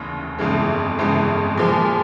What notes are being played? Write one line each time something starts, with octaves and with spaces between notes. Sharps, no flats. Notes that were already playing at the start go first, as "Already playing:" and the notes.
Already playing: F1 D#2 C#3 E3
G1 F2 C#3 E3 G#3
G1 F2 C#3 E3 G#3
A#2 F3 G#3